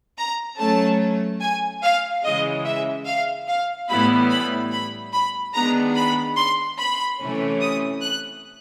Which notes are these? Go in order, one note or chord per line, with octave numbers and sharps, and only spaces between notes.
A#5
F#3 A3 C#4 A5
G#5
F5
C#3 E3 G#3 D#5
E5
F5
F5
A2 E3 G3 B3 E4 B5
B5
B5
B5
D#3 G#3 B3 D4 A#5
B5
C6
B5
C3 E3 A3 C#4
D#6
F#6